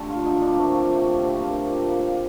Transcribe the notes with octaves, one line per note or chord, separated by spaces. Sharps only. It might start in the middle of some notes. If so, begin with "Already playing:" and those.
Already playing: D3 A3 G4 A4
F4
D3 D#4
D4
A#3
A3 C4
F4
A3 G4
G4
D3 C4
A#3
A#2
A#3